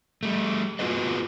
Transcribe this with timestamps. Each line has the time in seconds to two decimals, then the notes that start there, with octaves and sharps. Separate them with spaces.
0.23 G3 A3
0.79 B3 F4 F#4 G#4 B4 D#5